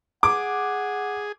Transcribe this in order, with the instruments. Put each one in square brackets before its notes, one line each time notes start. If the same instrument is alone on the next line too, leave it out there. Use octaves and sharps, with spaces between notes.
[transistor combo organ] G#4 [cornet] F#5 [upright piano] D6